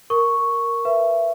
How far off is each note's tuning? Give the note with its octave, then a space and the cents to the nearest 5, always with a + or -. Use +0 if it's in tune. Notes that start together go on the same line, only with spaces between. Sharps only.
A#4 +0 C#6 +0
B4 +0 E5 +25